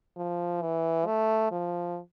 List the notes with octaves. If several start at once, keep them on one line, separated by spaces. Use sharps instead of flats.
F3
E3
A3
F3